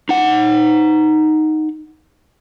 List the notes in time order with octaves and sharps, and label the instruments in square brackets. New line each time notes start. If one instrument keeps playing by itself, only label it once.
[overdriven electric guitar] D#4 F#5